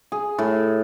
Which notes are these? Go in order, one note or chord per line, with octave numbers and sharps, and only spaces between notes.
G#4
A2